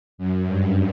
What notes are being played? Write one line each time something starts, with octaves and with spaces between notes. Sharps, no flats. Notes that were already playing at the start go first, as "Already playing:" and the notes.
F#2
G2